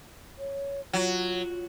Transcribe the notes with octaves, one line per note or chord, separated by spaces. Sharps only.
C#5
F#3 F4